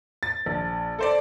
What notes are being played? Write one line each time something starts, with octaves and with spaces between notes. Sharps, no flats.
A6
A#1
A4 C5 D5